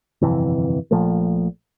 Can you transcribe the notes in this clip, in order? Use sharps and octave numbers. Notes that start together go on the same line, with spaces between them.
G1 F2 C3 E3
A#1 A#2 F3 A3